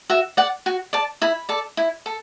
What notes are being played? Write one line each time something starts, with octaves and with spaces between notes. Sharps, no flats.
F#4 E5
D5 F#5
F#4
D5 A5
E4 B5
A4 D5
E4
A4